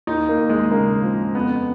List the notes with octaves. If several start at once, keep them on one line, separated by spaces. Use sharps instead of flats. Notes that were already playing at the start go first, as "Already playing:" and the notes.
D#2 D#4
A#3
D#2
G#3
C#3 A#3
F3
F2 B3